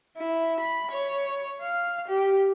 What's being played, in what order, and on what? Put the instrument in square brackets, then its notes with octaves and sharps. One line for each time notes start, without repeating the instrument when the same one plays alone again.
[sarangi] E4
B5
C#5
F5
G4